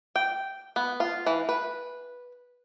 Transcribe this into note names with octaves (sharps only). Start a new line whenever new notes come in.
G5
B3
F4
E3
B4